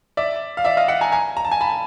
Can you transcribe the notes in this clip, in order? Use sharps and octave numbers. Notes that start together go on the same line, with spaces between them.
D5 E5
F5
D5 E5
D#5 F5
E5 F#5
G#5 A#5
G#5 A#5
A#5
A5
G#5 A#5
A5 B5